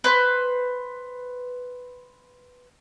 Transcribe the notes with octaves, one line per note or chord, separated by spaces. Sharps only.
B4 C5